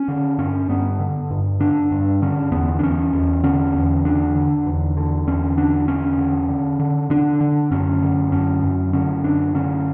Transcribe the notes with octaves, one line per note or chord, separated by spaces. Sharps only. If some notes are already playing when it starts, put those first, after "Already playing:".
Already playing: C#4
D3
G2 C#4
G2 B3
D3
G2
D3 D4
G2
D3 C#4
E2 B3
D4
E2 C#4
E2
D3 C#4
E2
D3 D4
D3
E2
D3
E2 C#4
D3 D4
E2 C#4
D3
D3
D3
D3 D4
D3
F#2 C#4
D3
F#2 C#4
F#2
D3 C#4
F#2 D4
D3 C#4